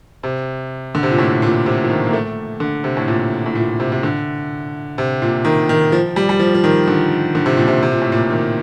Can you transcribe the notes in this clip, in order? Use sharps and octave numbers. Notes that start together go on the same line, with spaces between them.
C3
D3
C3
A#2
A2
A#2
C3
F3
D#3
A#3
A3
D3
C3
A2
A#2
A2
A#2
C3
C3
D3
C3
A#2
D#3
D#3
F3
G3
G3
F3
F3
D#3
D3
D3
C3
A#2
C3
C3
A#2
A2
A#2
D#3